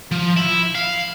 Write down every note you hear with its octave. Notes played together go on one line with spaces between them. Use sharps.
F3
E4
F5